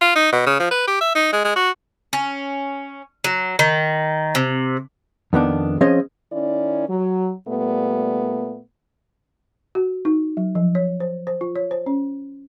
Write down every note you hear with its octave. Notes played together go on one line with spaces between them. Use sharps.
F4
D#4
B2
C#3
F3
B4
G4
E5
D#4
G#3
G#3
F#4
C#4
F#3
D#3
C3
F2 D#3 B3 D4
F3 C4 C#4 G#4 C5 D#5
D#3 C#4 E4 D5
F#3
A#2 G3 A3 B3
F#4
D#4
F#3
F3
C#5
C5
C5
F4
C#5
C5
C#4